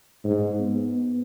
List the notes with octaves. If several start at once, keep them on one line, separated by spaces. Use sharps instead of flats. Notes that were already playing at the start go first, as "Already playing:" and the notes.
G#2
B3